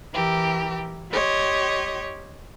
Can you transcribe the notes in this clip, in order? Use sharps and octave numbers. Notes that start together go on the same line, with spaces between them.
E3 G4 A#4
G4 C#5 D#5 C6